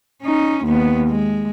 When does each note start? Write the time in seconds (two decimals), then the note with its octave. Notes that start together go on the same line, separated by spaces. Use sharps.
0.22 C#4 D#4
0.65 D#2 B3
1.10 G#3